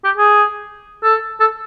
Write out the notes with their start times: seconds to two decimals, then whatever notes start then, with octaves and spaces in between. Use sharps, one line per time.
0.05 G4
0.17 G#4
1.03 A4
1.40 A4